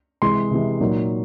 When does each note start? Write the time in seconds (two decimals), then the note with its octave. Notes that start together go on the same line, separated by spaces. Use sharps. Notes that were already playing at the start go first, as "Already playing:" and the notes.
0.22 C3 E3 G#3 C6
0.51 C3 E3 G#3
0.81 A#2 F#3 A#3 D#4